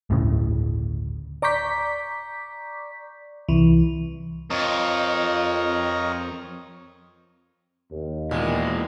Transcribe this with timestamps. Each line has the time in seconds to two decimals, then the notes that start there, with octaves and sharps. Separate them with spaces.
0.10 G1 D2 A2 C#3
1.42 D5 A#5 C#6 D6 G6 B6
3.49 C2 E3
4.50 F2 A#4 C#5 D#5
7.91 D#2
8.31 E2 A#2 G#3